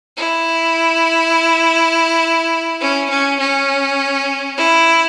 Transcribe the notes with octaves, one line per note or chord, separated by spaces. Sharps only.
E4
C#4
C#4
C#4
E4